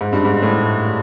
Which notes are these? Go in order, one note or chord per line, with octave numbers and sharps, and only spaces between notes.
G#2
G2
G#2
A2